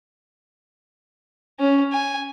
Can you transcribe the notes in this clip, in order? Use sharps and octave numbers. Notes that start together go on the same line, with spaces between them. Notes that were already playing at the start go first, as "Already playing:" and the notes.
C#4
G#5